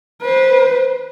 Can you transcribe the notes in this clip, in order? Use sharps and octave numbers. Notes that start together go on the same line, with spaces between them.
B4 C5